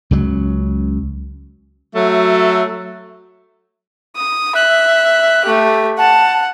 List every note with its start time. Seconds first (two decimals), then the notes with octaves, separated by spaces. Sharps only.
0.11 C#2 C#3 F#3
1.95 F#3 A3 E5
4.16 D#6
4.55 E5 F#6
5.45 A3 G4
5.98 F#5 A5